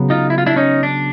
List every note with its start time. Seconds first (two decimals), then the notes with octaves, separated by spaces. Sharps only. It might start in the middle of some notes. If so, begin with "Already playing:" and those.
Already playing: C#3 F#3 B3
0.10 D#4 F4
0.30 E4
0.38 F4
0.46 D4 E4
0.56 C#4 D#4
0.83 D4